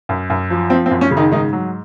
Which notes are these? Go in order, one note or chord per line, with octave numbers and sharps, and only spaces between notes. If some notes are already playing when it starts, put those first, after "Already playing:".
F#2
F#2
F3
F3 C4
C4
F#2
C#4
C#3
D#3 D#4
G#2 D#3 D#4
F#3